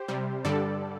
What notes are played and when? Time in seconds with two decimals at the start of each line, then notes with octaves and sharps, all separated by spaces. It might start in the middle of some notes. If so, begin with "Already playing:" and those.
Already playing: G4 C5
0.08 C3 G3
0.45 G2 D3 G3 A4 D5